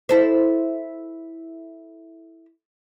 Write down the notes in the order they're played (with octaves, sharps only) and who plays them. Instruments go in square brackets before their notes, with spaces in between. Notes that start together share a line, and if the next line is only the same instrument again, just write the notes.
[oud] E4 A4 C5